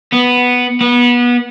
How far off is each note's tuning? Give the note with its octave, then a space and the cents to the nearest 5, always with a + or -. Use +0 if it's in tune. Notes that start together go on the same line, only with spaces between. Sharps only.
B3 +0
B3 -25